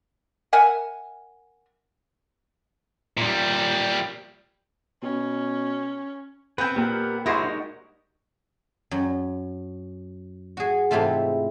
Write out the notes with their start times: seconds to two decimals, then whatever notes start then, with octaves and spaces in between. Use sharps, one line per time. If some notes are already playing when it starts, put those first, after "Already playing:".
0.53 A#4 E5 F#5 G#5
3.17 A#2 G3
5.03 B2 C#4
6.58 B3 C4 B4 G5
6.76 A#2 G4 A#4 F#5
7.26 G3 G#3 E4 F#4 A#4 C5
7.44 D#4 F#4
8.91 F#2
10.57 F#4 G#4
10.91 G#2 C3 E3 A3 F4